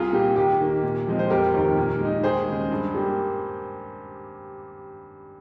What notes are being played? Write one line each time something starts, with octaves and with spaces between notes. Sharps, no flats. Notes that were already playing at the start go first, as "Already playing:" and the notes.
Already playing: C2 F4 G#4
A#2 G3 A#3 G4
D#2 G4
D#3 A#3
A#2
F3 G#3 C4
C5
F1 G4 A#4
D#2 D#3
A#2
G#3 D#4
D#2 G#4 C5
C#3 G#3
G2
G3 A#3